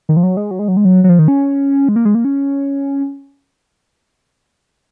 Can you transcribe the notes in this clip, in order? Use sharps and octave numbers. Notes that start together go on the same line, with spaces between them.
D#3
F3
F#3
G#3
F#3
G#3
F#3
G#3
F#3
F#3
F3
D#3
C#4
G#3
A#3
G#3
A#3
C#4